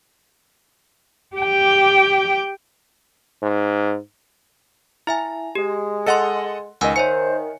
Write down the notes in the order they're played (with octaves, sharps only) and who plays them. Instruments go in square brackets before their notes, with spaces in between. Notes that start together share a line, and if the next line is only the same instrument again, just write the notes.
[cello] G4 G5
[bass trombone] G#2
[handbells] E4 E5 G#5 [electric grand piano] A#5
[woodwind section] G#3 [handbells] G4
[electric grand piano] A4 D#5 F#5 [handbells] C6 A6 C#7
[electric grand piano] C#2 D#5 [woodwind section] D#3 [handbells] F#5 G#5 E6
[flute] C5 [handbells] C#5 E5 G#5 [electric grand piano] C#7